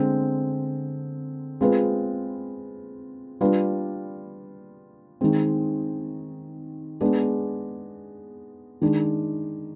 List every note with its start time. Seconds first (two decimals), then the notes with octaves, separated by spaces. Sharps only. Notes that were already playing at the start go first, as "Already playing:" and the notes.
Already playing: D3 G#3 C4
1.61 G#3 C4 F4 G#4 B4
3.41 G3 D4 F4 B4
5.21 D#3 G#3 C4
7.01 G#3 B3 D4 G#4
8.82 D#3 G#3 D4